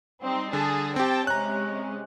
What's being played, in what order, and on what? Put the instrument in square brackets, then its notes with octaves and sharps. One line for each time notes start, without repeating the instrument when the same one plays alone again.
[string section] G3 C4 D#4
[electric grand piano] D3 [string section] G#4 A5
[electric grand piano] C4 G4 [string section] G5 A5
[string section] C3 G#3 C#4 [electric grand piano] A#5 F#6